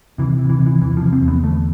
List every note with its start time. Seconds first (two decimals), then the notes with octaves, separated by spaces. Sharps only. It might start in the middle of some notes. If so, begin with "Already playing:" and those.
0.18 C3 E3
0.39 C3
0.49 E3
0.60 C3
0.66 E3
0.81 E2 E3
0.97 F3
1.02 C3
1.13 C4
1.22 E2
1.28 B3
1.43 D3 A3